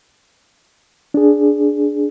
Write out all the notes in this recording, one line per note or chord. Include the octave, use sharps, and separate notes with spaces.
D4 G#4